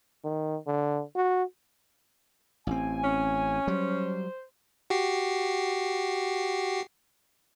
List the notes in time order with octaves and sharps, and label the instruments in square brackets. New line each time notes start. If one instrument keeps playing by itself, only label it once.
[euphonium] D#3
D3
F#4
[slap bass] A1 C4 [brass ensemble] G#5
[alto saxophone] C#4
[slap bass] F#3 G3 [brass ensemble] C5
[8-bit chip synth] F#4 G4 C7